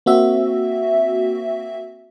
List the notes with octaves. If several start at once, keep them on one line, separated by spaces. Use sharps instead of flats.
A#3 C4 F#4 E5